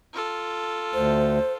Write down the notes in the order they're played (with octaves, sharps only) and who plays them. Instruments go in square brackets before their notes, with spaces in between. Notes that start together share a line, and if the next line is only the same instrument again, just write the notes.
[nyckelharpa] F4 A4
[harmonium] D2 [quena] C5